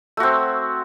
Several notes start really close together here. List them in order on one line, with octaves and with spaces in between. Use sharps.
A3 F#4 C4